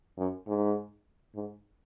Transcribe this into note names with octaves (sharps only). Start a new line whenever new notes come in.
F#2
G#2
G#2